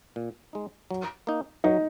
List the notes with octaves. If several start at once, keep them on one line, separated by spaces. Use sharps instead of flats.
A#2
G#3 D#4
F#3
A#3 D#4
F#3 D#4